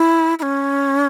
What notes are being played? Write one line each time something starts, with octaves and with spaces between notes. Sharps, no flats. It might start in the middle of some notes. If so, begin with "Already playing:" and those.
Already playing: E4
E4
C#4